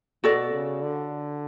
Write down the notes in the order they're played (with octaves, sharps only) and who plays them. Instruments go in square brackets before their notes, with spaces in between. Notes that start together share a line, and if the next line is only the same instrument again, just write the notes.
[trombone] B2 [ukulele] F#4 A4 D5
[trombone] C#3
D3